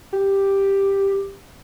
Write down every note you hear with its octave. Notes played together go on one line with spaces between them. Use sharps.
G4